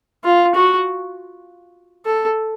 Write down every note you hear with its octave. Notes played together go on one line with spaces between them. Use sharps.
F4
F#4
A4